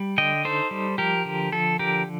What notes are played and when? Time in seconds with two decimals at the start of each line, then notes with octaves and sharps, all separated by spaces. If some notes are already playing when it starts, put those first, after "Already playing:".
Already playing: G3
0.18 D3 D#5 G5
0.45 D#4 A4 C5
0.71 G3
0.98 F3 G4 A#4
1.25 D3
1.52 F3 A4
1.79 D3 G4 A#4